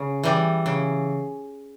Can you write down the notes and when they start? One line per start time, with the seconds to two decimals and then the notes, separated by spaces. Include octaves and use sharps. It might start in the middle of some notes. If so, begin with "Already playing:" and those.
Already playing: C#3
0.24 E3 G3
0.66 C#3